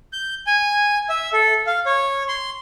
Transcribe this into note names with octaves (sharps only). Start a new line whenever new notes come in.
G6
G#5
E5
A4
F5
C#5
C6